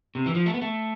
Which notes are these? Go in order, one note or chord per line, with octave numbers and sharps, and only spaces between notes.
C3
E3
F3
A3
B3
A3